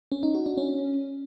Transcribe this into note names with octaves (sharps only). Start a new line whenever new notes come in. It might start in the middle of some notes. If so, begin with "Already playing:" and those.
C#4
D#4
F#4
D4
C#4